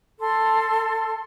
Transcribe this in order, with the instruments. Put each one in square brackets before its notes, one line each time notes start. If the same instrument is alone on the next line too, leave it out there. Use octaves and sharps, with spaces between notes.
[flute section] A4 C6